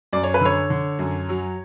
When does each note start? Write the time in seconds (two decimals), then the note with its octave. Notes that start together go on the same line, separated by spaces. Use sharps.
0.13 F#2 D5
0.24 C#5
0.34 B4
0.41 D3 C#5
0.70 D3
0.99 F#2
1.29 F#3